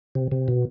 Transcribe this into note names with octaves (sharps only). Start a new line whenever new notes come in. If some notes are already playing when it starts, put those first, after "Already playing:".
C3
C3
B2